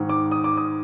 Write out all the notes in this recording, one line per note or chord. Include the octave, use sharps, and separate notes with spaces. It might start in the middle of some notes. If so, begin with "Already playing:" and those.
Already playing: G#2 D#3
D6
D#6
D6
D#6